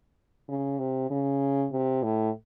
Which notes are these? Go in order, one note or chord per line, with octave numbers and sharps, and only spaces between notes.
C#3
C3
C#3
C3
A2